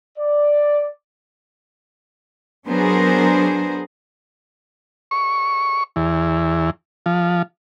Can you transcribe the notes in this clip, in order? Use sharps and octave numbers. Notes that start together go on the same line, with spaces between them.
D5
F#3 B3 D4 G#4 A#4 C5
C#6
E2
F3